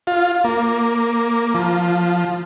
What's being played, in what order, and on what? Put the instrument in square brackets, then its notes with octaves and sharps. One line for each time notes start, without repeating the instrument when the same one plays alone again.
[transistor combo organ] F4
A#3
F3